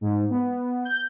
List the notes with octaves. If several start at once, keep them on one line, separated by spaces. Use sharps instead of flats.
G#2
B3
G6